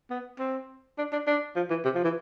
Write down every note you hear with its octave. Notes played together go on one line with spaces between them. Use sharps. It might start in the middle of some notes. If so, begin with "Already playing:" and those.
B3
C4
D4
D4
D4
F3
E3
C3
F3
E3